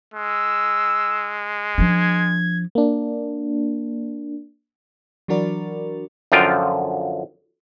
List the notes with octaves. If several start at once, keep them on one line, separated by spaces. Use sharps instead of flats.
G#3 E6
F3 D4 G#6
A#3 D4
E3 F#3 D4 F#4 A#4 D5
F#2 D3 F3 F4 G5